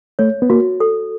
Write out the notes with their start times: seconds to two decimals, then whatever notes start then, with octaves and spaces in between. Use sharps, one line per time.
0.19 A3 C#5
0.42 B3
0.50 A#3 F#4
0.80 A4